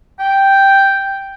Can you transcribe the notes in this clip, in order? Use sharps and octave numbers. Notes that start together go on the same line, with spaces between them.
G5